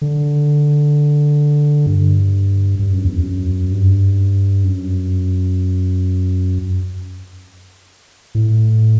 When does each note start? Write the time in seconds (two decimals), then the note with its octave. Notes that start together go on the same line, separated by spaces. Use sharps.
0.01 D3
1.86 G2
2.79 G2
2.92 F#2
3.05 E2
3.18 F#2
3.72 G2
4.64 F#2
8.35 A2